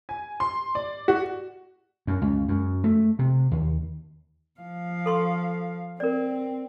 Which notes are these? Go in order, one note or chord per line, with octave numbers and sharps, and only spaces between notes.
G#5
C6
D5
F#4
F#2
C#2
F#2
A3
C3
D#2
F3 F5
A4 C6 C#6
C4 A#4 D5